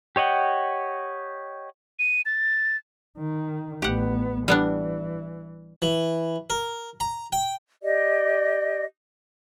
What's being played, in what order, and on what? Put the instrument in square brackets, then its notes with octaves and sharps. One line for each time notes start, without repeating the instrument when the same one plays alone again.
[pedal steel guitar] G4 C#5 D#5 F#5 G5
[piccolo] D#7
A6
[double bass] D#3
[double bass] A1 B3 [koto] G4 F#5
[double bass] E3 [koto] G3 B3 D4
[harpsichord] E3
A#4
A#5
G5
[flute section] G4 D5 D#5